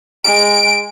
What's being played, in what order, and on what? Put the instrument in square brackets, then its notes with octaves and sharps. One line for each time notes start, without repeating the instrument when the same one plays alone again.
[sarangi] G#3 [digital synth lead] D7